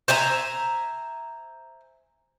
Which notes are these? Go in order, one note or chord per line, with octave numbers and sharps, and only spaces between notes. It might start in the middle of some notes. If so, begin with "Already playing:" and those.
C5 E5 G#5 A#5